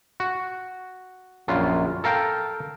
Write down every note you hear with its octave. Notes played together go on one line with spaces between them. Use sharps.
F#4
A#1 F#2 F4
A4 A#4 F5 G5